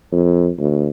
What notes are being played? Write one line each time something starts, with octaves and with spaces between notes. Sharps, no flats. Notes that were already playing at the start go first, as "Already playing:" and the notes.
F2
D2